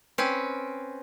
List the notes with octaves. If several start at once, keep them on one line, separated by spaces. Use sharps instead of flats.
C4 C#4 B4